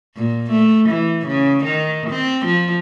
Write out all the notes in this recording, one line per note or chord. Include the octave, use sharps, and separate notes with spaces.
A#2
A3
E3
C#3
D#3
C4
F3